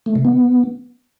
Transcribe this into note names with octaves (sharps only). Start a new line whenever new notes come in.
A3
C3
B3